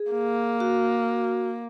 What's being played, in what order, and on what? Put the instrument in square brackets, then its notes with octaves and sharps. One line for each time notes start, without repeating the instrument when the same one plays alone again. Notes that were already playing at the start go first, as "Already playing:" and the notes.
Already playing: [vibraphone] G#4
[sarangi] A#3
[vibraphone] F#4